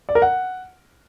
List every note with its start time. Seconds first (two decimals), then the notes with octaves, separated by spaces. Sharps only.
0.09 D5
0.15 A#4
0.22 F#5